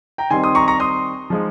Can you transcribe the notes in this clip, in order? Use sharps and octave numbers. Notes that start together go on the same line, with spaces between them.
G5 A#5
D#3 G3 C4 D#4 G#5 C6
C6 D#6
A#5 C#6
A#5 C#6
C6 D#6
F3 G#3 D#4